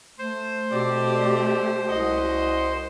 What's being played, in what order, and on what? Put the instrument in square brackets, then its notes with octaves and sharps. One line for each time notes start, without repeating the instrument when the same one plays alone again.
[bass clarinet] A3 [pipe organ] C5
[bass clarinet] B2 [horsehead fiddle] A3 G4 [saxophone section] C4 D5
[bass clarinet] C2 [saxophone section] C#4 F#4 D#5